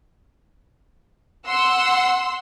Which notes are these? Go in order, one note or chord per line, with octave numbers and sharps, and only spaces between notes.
F#5 C6 E6